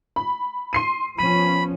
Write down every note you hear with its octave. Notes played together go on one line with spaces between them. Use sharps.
B5
C6 C7 D#7
F3 B3 C#4 B5 D#7